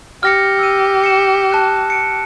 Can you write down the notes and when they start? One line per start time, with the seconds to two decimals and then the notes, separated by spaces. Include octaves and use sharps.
0.23 G4 F6 A#6 C#7
0.59 E6 D#7
1.04 C#7 E7
1.52 A5 F#6
1.90 C#7 D7